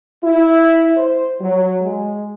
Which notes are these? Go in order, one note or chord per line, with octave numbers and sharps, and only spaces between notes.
E4
C5
F#3
G#3